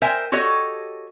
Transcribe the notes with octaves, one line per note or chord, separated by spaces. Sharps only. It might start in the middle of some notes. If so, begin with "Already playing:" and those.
A#4 C5 E5 G5 G#5
F#4 G4 A4 C#5 D#5